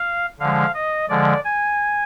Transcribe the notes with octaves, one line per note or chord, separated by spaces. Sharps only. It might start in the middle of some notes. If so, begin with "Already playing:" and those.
Already playing: F5
D3 F3 G#3 F5
D#5
D3 F3 G#3 D5
G#5